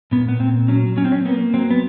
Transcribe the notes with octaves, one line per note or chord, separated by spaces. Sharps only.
A#2 B3
B3
A#2 C4
F#3 C#4
F#3 C#4
C4
C#4
A#3 B3
F#3 C4
B3